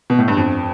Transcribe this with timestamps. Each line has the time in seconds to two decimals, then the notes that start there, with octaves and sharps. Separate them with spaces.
0.10 B2
0.19 A2
0.28 G2
0.37 F2